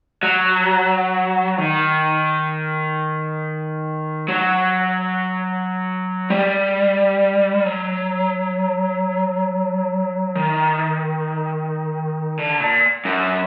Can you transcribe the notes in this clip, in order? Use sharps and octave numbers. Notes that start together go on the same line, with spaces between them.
F#3
D#3
F#3
G3
F#3
D#3
D3
A#2
F#2